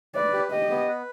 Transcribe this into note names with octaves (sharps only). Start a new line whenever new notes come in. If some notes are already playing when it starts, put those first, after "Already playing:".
B4 D5
G4
G4 D#5
B3
B4